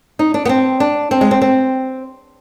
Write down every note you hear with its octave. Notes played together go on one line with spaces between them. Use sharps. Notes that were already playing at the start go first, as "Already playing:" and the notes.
D#4
D4
B3
C4
D4
C4
G#3
C4
C4